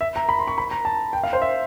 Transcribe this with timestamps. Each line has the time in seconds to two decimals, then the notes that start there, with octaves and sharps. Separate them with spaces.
0.01 E5
0.16 A#5
0.29 B5
0.39 C6
0.48 C#6
0.58 B5
0.71 A#5
0.85 A5
1.13 G5
1.23 F5
1.33 C5
1.42 E5